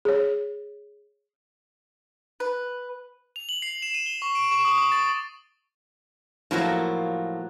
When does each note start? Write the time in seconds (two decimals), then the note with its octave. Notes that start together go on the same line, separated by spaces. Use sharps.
0.05 G#4 C#5
2.40 B4
3.36 F7
3.49 F#7
3.62 C7
3.82 E7
3.94 D#7
4.06 G7
4.22 C#6
4.35 D7
4.51 C#6
4.65 D#6
4.78 D6
4.92 A6
6.51 A2 F3 F#3 A#3